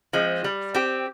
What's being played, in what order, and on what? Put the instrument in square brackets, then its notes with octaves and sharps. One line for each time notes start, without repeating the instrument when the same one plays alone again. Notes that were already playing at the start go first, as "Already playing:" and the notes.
[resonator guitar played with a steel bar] F3 G#3 C4
G3
C4 G4